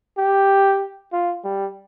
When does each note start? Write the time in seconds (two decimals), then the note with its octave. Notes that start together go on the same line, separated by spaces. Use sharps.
0.18 G4
1.13 F4
1.44 G3